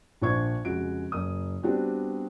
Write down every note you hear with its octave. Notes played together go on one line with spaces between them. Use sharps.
A#1 D4 C5 C#6 G#6
F1 C#3 G#3 F#4 D7
F#1 D#6
G3 B3 C4 D4 F#4 G4